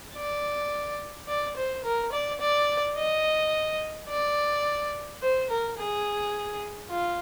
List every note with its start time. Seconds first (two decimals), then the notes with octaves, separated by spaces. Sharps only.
0.15 D5
1.28 D5
1.56 C5
1.84 A#4
2.12 D5
2.40 D5
2.97 D#5
4.09 D5
5.22 C5
5.50 A#4
5.78 G#4
6.90 F4